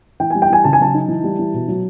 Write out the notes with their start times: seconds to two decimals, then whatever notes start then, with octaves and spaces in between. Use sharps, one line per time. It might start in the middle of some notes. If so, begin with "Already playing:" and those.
0.20 E3 G5
0.30 G3 G#5
0.42 G5
0.50 E3 G#5
0.64 C#3 A5
0.73 G#5
0.80 F#3 A5
0.94 D#4
1.08 E3
1.24 G3
1.39 E3
1.53 B2
1.68 F#3